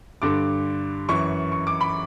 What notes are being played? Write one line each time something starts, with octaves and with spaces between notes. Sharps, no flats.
G2 D3 D6
F#2 E3 C#6
C#6
D6
B5